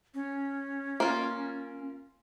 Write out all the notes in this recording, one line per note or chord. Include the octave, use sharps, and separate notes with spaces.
C#4
A#3 F4